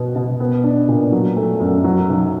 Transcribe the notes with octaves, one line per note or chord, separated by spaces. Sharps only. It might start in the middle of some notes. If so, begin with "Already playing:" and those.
Already playing: B2 B3
B2
B3
D4
A#2
F#3
A3
F#2
F#3
B1